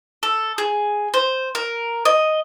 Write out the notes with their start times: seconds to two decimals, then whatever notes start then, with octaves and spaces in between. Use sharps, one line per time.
0.23 A4
0.58 G#4
1.14 C5
1.55 A#4
2.05 D#5